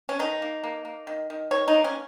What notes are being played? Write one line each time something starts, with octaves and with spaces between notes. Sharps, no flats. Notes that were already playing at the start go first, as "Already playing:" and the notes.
C#4
D#3 D#4
A#3
A#3
A#3
D#3
D#3
D#3 C#5
D#4
A#3
C#4